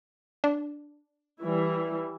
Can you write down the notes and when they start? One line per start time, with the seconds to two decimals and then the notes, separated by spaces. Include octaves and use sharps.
0.44 D4
1.39 E3 G3 E4